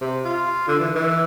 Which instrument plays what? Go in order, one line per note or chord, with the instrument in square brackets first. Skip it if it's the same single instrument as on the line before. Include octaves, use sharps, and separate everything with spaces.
[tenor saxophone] C3
F4
D3
E3
E3